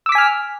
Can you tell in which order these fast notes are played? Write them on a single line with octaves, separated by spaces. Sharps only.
E6 D6 B6 G#5 F6